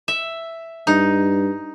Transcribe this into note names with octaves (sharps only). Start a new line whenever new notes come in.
E5
G2 D#4